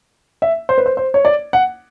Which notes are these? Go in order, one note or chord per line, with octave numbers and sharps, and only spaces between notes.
E5
C5
B4
C5
C5
C#5
D5
F#5